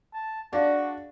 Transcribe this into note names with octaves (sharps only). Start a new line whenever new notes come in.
A5
D4 F#4 G#4 D5 F5